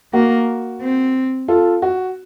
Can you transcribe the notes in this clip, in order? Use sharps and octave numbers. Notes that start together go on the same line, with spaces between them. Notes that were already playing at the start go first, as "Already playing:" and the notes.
A#3 F#4 A#4
C4
F4 A4
F#4